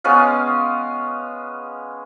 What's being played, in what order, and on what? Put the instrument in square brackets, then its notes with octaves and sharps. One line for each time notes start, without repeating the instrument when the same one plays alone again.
[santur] G#3 B3 C#4 F5